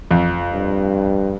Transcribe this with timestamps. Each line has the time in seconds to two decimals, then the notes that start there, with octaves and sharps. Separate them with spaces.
0.11 F2
0.54 G2